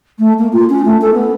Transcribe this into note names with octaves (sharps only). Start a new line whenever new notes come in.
A3
A#3
F4
C#4
A3
A4
B3